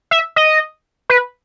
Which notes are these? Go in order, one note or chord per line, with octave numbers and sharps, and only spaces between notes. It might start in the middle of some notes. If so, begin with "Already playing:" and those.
E5
D#5
B4